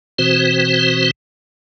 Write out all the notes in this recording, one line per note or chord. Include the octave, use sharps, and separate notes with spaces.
B2 E3 C4 F#4 C5